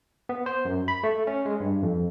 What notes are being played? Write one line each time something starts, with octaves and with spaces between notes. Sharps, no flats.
B3
C5
F#2
B5
A3
C#4
G#3
G2
F2